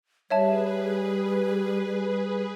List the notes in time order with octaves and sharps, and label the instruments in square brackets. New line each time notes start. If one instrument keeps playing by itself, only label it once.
[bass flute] G3 [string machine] G#4 B4 [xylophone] C#5 E5 A5